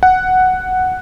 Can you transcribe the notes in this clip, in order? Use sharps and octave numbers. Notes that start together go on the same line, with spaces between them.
F#5